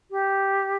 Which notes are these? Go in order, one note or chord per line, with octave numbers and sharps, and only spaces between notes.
G4